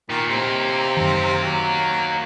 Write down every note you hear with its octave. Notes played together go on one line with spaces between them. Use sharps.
A#2 D#3
C3 A#3 D#4
F#2 D#3
F#3